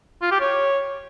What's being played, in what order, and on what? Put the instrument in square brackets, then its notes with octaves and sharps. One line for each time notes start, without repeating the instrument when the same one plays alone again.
[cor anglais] F4
G4
C#5